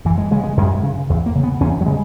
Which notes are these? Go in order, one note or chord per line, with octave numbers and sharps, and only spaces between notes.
F#2 E3
G#3
C#3 G#3
G#3
F#2 G#3
C#3
E2
A#3
C#3
B3
E2 C#4
F#3
C#3 G#3